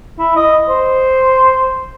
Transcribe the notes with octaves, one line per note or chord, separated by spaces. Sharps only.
E4
D#5
C5